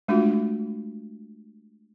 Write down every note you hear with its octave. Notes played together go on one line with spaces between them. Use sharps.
G#3 A3 D4 F4 F#4